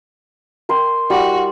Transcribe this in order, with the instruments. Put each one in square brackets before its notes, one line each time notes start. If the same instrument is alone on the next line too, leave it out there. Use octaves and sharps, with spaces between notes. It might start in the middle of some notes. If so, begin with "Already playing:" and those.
[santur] A#4 G5 C6
[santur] G3 E4 [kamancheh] F#4